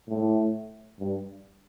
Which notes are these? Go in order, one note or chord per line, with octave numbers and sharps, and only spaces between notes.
A2
G2